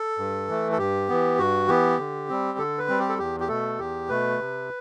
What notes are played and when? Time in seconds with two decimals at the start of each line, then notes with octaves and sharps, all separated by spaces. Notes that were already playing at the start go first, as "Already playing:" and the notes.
Already playing: A4
0.18 G2
0.48 E3 A3
0.72 A4
0.78 G2 G4
1.09 E3 B3
1.38 G2 F#4
1.68 E3 B3 G4
1.99 D3
2.29 G3 C4
2.58 D3 A4
2.78 B4
2.88 G3 C4
2.99 G4
3.09 A4
3.19 E2 G4
3.40 G4
3.48 B2 A3 A4
3.79 E2 G4
4.09 B2 A3 B4
4.39 C3